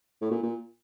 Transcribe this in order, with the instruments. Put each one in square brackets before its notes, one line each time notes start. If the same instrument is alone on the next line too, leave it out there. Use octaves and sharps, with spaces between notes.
[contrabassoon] A2
A#2
A#2